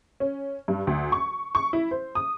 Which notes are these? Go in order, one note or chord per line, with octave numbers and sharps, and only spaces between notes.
C#4
G2
D2
C#6
C#6
E4
C5
D#6